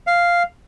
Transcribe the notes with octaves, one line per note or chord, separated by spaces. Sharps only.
F5